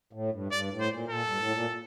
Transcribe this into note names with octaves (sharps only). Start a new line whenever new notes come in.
A2
G2
G2 D5
A2
C5
A#2
A#2 A4
G2
A2
A#2